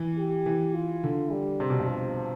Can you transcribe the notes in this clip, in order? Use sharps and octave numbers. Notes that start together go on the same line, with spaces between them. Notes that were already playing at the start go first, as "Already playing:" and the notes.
Already playing: E3
G4
E3
F4
D3
G3
C3
B2
G2
F3